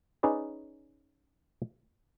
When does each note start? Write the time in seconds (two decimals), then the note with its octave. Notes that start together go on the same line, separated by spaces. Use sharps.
0.23 C#4 D#4 G#4 B4 D5